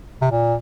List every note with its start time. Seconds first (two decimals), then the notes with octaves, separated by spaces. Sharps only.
0.22 C3
0.31 A#2